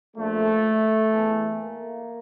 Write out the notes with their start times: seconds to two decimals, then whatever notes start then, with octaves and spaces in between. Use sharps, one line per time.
0.16 A#1 A#2 F3 A3
1.12 E2 E3
1.59 A#3